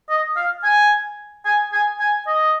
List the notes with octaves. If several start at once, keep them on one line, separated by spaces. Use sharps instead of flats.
D#5
F5
G#5
G#5
G#5
G#5
D#5